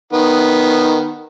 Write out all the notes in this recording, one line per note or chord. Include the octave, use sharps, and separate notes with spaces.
D#3 B3